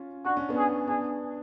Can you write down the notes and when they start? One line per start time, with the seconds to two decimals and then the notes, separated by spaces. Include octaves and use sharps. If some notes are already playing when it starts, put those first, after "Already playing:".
Already playing: C#4 F4
0.25 D4 F#4
0.37 C#4
0.49 B3 D4
0.57 G#4
0.88 B3 D4 G#4